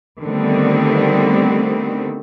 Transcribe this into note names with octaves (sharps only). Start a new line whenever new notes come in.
D3 D#3 G3 A3 B3 C4